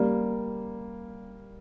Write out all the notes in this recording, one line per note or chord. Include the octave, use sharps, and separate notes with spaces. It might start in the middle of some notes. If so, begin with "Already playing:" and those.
Already playing: G3 A#3